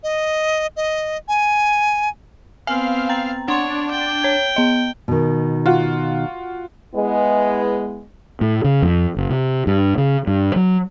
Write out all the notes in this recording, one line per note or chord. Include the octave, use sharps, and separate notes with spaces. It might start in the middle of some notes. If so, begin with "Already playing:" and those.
D#5
D#5
G#5
B3 C4 F5 G#5
G5 A#5 A6
D4 C#5 F#5 C6
G5
C#5 G#6
B3 D#5
B2 D#3
F4 F#4
G#3 B3 E4
A2
C#3
F2
F#1
C3
G2
C#3
G2
F#3